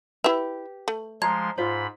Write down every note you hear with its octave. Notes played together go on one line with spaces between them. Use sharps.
E4 G4 B4 E5
A3
F3 G#3 A#5 C6 G#6
G#2 F4 C5 B5